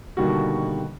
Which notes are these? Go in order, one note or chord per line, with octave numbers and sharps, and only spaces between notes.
B2 D3 D#3 G3 A#3 F#4